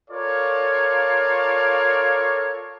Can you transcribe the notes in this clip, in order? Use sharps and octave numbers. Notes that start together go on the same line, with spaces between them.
F4 A4 A#4 C#5 D5 F5